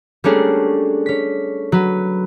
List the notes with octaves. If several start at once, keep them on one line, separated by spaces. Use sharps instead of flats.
G3 A3 A#3 C#4 D4 G#4
C#4 B6
F#3 B4